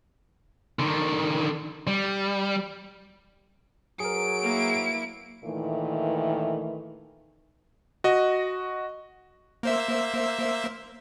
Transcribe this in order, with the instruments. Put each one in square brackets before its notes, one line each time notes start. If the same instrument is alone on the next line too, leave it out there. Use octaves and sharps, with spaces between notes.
[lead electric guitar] D3 D#3
G3
[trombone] F#3 [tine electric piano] G#4 A#4 [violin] D7
[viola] A#3 E4
[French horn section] A#2 D#3 E3 A3
[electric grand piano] F#4 D#5
[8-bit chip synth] A#3 C5 E5